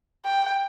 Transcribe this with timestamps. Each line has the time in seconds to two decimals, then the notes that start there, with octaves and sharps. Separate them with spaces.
0.25 G5